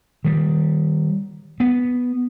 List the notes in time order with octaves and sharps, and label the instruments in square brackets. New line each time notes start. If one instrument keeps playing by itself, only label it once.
[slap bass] D#3 G3
B3